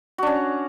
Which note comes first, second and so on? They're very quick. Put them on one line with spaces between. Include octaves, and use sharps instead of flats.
F#4 D4 C#4